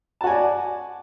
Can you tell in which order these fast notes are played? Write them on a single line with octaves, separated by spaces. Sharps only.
A5 F#4 G#5 D5